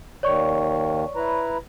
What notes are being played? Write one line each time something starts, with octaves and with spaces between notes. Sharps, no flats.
D#2 D#3 C#5 D5 C#6
E4 B4 A#5